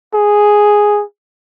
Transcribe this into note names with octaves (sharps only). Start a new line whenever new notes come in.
G#4